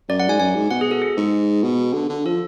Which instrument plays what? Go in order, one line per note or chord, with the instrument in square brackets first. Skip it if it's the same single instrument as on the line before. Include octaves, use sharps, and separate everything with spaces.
[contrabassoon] F#2 [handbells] D5
[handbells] F#5
[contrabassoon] G#2 [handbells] G#5
[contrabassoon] F#2 [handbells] G#5
[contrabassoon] G#2
[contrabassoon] B2 [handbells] F#5
[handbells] G#4
A4
G#4
[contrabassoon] G#2
B2
D3
D3
[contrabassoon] F3 [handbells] A4